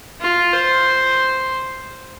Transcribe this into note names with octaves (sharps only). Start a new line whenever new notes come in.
F4
C5